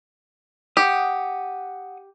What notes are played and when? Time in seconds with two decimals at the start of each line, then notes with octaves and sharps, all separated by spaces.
0.77 G4 F#5 D#6